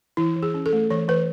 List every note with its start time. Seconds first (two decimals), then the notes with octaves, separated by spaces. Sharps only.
0.17 E3 E4
0.36 E3
0.42 G#4
0.54 C#4
0.66 A4
0.73 A3
0.90 E3 C#5
1.08 E3 B4